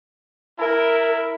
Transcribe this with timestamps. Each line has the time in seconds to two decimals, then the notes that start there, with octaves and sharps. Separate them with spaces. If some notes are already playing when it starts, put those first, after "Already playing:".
0.59 E4 A#4